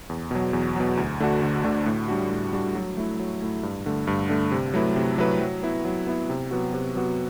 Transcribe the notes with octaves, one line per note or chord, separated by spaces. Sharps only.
E2
B2 F#3
E2
B2 F#3
D2
D3 A3 D4 F#4
D2
D3 A3 D4 F#4
A2
G3 D4 F#4
A2
G3 D4 F#4
F#3
A3 E4
F#3
A3 E4
G2
D3 A3
G2
D3 A3
C3
F#3 A3 E4 B4
C3
F#3 A3 E4 B4
F#3
B3 E4
F#3
B3 E4
C3
F#3 B3 F#4
C3
F#3 B3 F#4